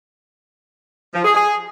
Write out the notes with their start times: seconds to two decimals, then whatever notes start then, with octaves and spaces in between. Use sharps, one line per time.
1.14 F3
1.24 G#4
1.35 G#4